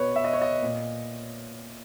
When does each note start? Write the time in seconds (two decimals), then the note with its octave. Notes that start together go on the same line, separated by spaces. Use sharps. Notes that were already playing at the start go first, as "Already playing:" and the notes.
Already playing: B2 B4 C#5
0.16 E5
0.24 D#5
0.33 C#5
0.42 D#5
0.62 A#2